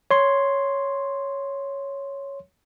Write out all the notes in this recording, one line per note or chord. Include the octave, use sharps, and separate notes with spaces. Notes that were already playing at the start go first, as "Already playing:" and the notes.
C#5 C6